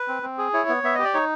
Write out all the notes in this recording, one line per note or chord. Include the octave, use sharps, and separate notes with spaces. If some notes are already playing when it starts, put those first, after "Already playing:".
Already playing: B4
C4
C4
G#4
E4 C#5
B3
B3 E5
G4 D#5
D5
D#4 C#5